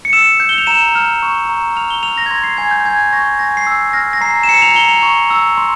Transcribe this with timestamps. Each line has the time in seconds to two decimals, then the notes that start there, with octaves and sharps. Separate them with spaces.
0.05 C#7
0.13 E6 E7
0.40 G6
0.49 G7
0.58 F7
0.67 A#5 E7
0.95 F6
1.22 C#6
1.49 A#5
1.76 F6 F7
1.90 G7
2.03 F6 F7
2.18 A#6
2.26 G#6
2.30 C6 A#6
2.44 C7
2.58 G#5 G#6
2.71 G6
2.85 G#5 G#6
3.13 C#6 A#6
3.39 G#5 A#6
3.57 C7
3.67 E6
3.93 F6 A#6
4.13 A#6
4.21 A#5 C7
4.43 E7
4.48 A#5 C#7
4.62 F7
4.75 A#5 G7
4.89 F7
5.03 C#6
5.30 E6
5.57 C6